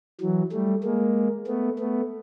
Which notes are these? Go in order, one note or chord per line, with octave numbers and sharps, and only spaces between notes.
E3 F#3
G3 A3
G#3 A#3
A3 B3
A3 B3